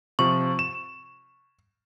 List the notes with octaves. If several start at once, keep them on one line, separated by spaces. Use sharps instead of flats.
C3 F3 C#6
E7